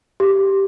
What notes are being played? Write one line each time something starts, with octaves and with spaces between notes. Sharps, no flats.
G4